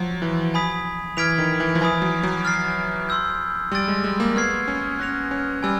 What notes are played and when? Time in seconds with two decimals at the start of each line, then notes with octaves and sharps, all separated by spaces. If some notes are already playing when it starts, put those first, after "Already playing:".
Already playing: F3 F#3
0.22 E3
0.54 G#5 B5 D#6 G#6 B6
1.17 E3 F6 G#6 B6 D7 F7
1.38 D#3
1.60 E3
1.75 F3
1.81 E3 G#5 B5 D#6
2.02 F#3
2.23 F#3
2.45 F6 A6 C7
3.09 C6 E6 G6
3.72 G3 C6 E6 A6 D7
3.88 G#3
4.04 G#3
4.20 A#3
4.36 B3 C#6 F6 G#6 C7
4.68 C#4
4.99 C#4 F#6 A#6 C#7 F7
5.31 C#4
5.63 G3 G#5 B5 E6